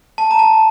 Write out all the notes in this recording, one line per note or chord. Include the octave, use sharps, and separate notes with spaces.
A5
A#5
A5